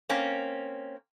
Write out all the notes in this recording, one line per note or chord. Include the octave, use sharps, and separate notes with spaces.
A#3 C4 C#4